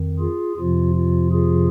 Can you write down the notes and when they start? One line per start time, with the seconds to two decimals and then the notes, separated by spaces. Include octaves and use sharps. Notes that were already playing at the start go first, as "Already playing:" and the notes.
Already playing: F2 D#3
0.19 F4 G#4
0.57 F2 C3 F3 F4
0.95 F4
1.32 F4 G#4